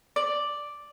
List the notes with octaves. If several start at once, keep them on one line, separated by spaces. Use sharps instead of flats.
D5